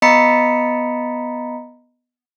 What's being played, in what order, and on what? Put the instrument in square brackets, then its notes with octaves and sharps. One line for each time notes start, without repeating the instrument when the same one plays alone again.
[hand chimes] B3 D#5 A#5 B5 B6 C#7